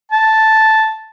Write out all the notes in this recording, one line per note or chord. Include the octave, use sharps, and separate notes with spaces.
A5